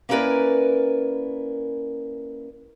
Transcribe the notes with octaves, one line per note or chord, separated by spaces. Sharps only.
A#3 C#4 E4 A#4 B4 D5